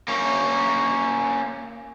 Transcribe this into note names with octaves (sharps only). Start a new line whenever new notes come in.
A#3 C#4